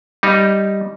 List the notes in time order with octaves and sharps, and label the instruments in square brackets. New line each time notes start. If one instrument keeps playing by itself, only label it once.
[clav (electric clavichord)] G3 D#4